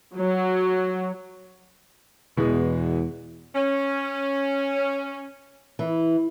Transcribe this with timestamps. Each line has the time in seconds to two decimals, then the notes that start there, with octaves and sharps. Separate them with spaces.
0.18 F#3
2.37 E2 B2 E3 G#3
3.54 C#4
5.79 E3